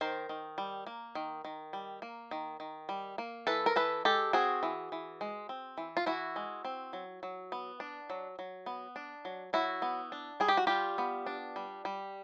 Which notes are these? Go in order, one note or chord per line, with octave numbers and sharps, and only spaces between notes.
D#3 A#4 C5
D#3
G3
A#3
D#3
D#3
G3
A#3
D#3
D#3
G3
A#3
E3 A4 B4
A#4
E3 A4 B4
G#3 G4 A4
C4 F#4 G#4
E3
E3
G#3
C4
E3
F4
E3 E4 F#4
G#3
C4
F#3
F#3
B3
D4
F#3
F#3
B3
D4
F#3
F#3 E4 F#4
B3
D4
G3 G#4
G4
F#4
G3 F4 G4
B3
D4
G3
G3